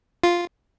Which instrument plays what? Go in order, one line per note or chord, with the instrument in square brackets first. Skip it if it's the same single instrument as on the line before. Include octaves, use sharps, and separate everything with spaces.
[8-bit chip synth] F4